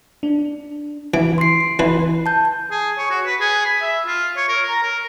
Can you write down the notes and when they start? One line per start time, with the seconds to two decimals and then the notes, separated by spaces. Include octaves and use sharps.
0.23 D4
1.14 E3 D7
1.38 C6 C7
1.79 E3 B4
2.26 A5 G6
2.71 G#4
2.98 C#5
3.10 F#4
3.26 B4
3.40 G#4
3.65 B5
3.82 E5
4.06 F4
4.37 C#5
4.49 A#4
4.69 A#5
4.83 A#4